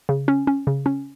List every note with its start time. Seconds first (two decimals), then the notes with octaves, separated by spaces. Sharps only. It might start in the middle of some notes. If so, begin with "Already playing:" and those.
0.09 C#3
0.28 C#4
0.47 C#4
0.67 C#3
0.86 C#4